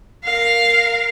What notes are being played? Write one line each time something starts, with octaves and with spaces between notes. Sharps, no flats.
A#4 F5